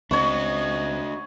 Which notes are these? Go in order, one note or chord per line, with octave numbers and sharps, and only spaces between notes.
C#2 C4 D4 F#4 C#5 D#5 C#6